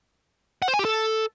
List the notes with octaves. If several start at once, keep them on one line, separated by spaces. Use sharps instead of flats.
F#5
C5
G#5
G4
A4